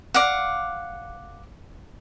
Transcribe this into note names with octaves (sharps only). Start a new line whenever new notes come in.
D5 F5 F#5